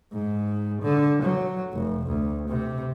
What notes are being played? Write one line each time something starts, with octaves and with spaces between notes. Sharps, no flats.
G#2
D3
F#3
F1
D2
C3